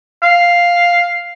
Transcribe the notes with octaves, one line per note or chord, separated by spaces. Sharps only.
F5